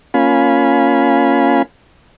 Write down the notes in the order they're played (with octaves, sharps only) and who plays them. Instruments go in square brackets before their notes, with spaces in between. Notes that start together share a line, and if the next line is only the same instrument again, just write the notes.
[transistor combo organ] A#3 C#4 F4 F5 G#5 B5